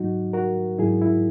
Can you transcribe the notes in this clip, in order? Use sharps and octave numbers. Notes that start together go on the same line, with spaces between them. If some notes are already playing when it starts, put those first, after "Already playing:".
Already playing: G#2 F#3 D#4 F#4
F#4 A#4
G#2 F#3 E4 G#4
E4